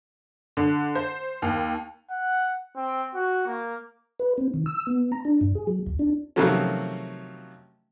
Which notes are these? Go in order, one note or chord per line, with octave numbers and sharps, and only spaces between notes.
D3
C5
D#2
F#5
C4
F#4
A#3
B4
C4
D#3
E6
B3
A#5
D4
G2
G#4
F#3
D2
D4
C3 D#3 F3 F#3 A3 C#4